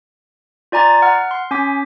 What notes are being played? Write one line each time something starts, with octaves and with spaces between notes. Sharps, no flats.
F4 D5 G#5 A#5 D6 A6
F#5 F6
C6
C#4 G#5 D6 B6